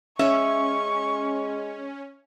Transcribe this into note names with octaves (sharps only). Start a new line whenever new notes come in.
G#3 C#4 E5 C#6